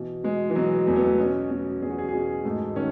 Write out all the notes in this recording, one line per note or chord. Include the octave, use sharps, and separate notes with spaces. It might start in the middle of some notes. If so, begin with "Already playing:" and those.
Already playing: B2 E3
B2 G#3
E3
B2 F#3
E2 A3
B3
A3
B2 C#4
B2
E2 G#4
F#4
G#4
G#4
B2 F#4
G#2 A3
D#3 C#4